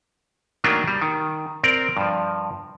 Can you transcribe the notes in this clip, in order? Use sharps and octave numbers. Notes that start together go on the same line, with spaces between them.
D#3 F#3 A3 A#3 D4 F4
G3
D#3
C4 A#4 D5
G2 F3